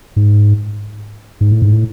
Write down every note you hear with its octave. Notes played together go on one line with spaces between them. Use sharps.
G#2
G#2
A2
G#2
A2